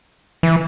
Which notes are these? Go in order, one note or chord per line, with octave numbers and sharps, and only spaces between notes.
E3